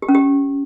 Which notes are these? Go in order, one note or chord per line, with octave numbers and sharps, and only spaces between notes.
G4
C#4
G4